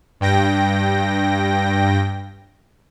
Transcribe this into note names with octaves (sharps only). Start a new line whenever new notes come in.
G2 G5 A#6